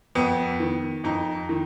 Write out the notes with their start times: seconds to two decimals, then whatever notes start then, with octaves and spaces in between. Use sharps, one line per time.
0.15 F2 B3
0.60 D#3
1.04 F2 D#4
1.49 D#3